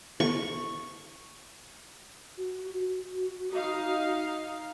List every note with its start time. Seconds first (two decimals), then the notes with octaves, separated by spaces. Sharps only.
0.20 C#6
2.38 F#4
2.74 F#4
3.52 D#4 F5